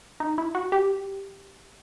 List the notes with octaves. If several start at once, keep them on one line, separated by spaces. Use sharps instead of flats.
D#4
E4
F#4
G4